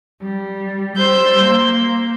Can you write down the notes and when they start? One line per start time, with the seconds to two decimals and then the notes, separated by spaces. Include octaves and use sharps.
0.23 G3
0.96 G3 C5 E6 G6
1.43 A#3